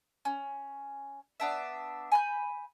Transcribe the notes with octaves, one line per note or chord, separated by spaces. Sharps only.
C#4
B3 D4 E5
G#5 B5 G6